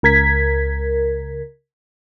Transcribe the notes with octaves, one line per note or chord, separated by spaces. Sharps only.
C#2 A#4 G#6 B6